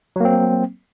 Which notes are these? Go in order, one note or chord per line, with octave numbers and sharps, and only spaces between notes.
F#3 A#3 C4